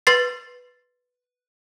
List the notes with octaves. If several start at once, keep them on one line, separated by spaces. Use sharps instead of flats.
B4 C6 A6 C7